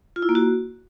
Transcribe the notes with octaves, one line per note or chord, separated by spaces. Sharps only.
F4
E4
A#3
F#4